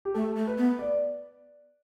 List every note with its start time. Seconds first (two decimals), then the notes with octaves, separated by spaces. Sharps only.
0.05 G4
0.14 A3 A4
0.36 A3
0.47 B4
0.58 B3
0.79 D5